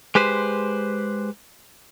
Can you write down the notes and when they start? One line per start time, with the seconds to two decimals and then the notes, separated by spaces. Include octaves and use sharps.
0.15 G#3 G4 B4 C5